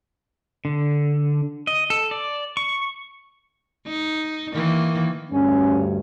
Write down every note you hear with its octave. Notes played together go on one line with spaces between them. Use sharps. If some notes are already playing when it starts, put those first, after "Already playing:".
D3
D#5
A4
D5
C#6
D#4
D#3 E3 A#3
D2 G2 C#4